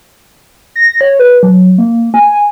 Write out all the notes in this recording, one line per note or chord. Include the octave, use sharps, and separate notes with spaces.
A#6
C#5
B4
F#3
A#3
G#5